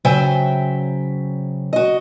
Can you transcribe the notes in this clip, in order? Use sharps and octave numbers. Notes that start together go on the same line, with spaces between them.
C#3 F#3 C5 E5 G5 G#5
F#4 D#5